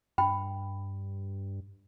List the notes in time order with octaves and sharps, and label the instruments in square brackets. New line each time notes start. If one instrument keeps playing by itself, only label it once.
[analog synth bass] G2 [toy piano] G5 B5